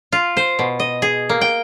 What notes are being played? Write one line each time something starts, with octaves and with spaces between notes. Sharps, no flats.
F4
C5
B2
D#5
G#4
A#3
G5